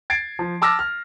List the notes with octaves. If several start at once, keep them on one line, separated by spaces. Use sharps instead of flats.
G#6 A6 C7 D7
F3
A5 D6 E6 F6 A6 A#6
F6